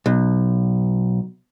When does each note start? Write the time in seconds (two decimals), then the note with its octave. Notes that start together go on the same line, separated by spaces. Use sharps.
0.06 B1